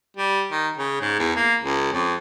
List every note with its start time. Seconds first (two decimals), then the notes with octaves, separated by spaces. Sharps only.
0.17 G3
0.51 D#3
0.77 C#3
1.01 G#2
1.19 E2
1.36 A#3
1.62 C#2
1.92 F2